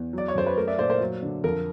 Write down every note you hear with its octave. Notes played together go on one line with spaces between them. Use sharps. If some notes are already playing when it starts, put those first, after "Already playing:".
Already playing: E2
F#3 D5
C#5
F#2 C5
B4
A3 A#4
D5 E5
A#2 C5 D5
A#4 C5
F#3
D3
F2 A#4